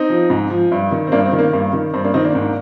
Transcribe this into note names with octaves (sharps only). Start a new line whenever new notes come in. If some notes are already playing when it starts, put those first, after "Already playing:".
Already playing: C4 D#4
F3
G#2
F3
G2
D#3
C4
G2 A#3 D4
C4
D#3
A#3
G2 A#3
D#3
G2 C4
A#3 D4
D#3 C4 D#4
A#3 D4
G#2